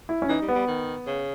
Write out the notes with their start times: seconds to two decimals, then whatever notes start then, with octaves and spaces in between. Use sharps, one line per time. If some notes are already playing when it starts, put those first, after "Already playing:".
0.09 E4
0.22 C#4
0.29 E3 D#4
0.42 G3
0.48 B3
0.55 G3
0.67 D#3
1.07 C#3